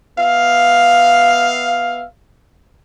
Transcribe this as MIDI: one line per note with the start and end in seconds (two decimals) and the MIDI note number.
0.17 2.03 59
0.17 2.03 76
0.17 2.03 77